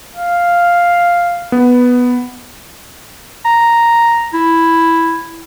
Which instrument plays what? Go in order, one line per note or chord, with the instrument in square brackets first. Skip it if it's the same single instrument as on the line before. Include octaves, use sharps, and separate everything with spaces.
[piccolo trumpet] F5
[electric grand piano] B3
[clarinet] A#5
E4